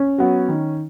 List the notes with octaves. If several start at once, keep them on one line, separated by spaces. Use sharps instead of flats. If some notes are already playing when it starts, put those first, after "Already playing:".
Already playing: C#4
F#3 B3 F#4
D#3